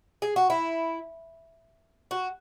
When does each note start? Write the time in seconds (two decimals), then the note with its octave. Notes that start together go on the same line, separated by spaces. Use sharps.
0.22 G#4
0.36 F#4
0.50 E4
2.11 F#4